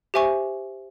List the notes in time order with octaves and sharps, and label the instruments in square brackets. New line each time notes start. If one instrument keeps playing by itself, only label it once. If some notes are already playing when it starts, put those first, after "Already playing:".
[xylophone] G4 C5 E5 G#5 C#6